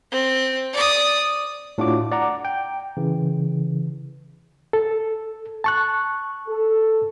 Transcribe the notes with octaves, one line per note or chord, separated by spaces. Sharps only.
C4
D5 D#6
A2 D4 F4 F#4 D6
D5 F#5 A#5 D6
G5
C#3 E3
A4
A5 C#6 F#6
A4